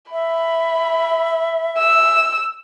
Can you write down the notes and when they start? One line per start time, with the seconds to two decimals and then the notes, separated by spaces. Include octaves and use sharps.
0.12 E5 B5
1.78 E6